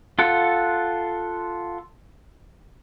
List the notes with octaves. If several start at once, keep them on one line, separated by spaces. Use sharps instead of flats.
F4 A4 F#5